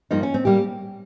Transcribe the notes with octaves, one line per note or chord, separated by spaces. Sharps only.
G2 F3 A#3 D#4
C#4
C4
G3 A#3 G4